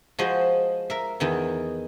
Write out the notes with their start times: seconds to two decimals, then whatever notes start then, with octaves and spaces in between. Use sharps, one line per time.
0.19 F3 G#3 F#4 C5 D#5
0.90 A#4 E5
1.20 E2 D#3 E3